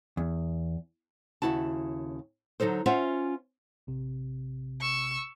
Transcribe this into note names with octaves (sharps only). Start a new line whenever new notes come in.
E2
D#2 C#3 E4 F#4 A5
D3 F#3 D#4 A4 C5
C#4 F4 C5 E5 F#5
A1 C3
C#6 E6